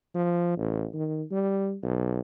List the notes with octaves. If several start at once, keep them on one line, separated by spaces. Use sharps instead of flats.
F3
A1
D#3
G3
B1